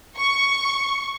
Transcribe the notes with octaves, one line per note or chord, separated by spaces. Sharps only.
C#6